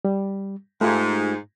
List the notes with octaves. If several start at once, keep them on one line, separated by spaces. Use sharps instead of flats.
G3
G#2 A3 F4 G4